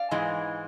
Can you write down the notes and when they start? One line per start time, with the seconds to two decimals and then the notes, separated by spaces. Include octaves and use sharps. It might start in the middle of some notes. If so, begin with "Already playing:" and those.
Already playing: D5 F5
0.11 G#2 E3 G#3